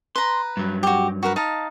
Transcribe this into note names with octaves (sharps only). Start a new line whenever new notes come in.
B4 A#5 C6
G2 F#3
F#4 G4
F#4 A#4 B4
D#4 F5 A5